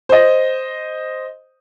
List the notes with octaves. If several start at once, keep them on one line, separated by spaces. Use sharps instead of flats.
C5 D#5